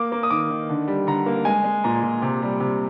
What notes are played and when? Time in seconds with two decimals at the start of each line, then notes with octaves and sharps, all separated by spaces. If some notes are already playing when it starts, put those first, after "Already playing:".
Already playing: A#3 D6
0.12 A#3
0.23 D#6
0.30 D#3 D6
0.50 D#3
0.70 D3
0.88 G3
1.07 D3 A#5
1.26 A#3
1.45 G#3 G#5
1.64 G#3
1.84 A#2 A#5
2.03 A#2
2.22 C3
2.42 G3
2.60 C3